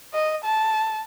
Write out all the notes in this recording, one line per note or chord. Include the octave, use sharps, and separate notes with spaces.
D#5
A5